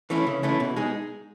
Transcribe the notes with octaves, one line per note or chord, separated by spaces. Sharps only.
E3 A3 C#4 E4
C#3
E3 A3 C#4 E4
B2
G#3 D#4 G#4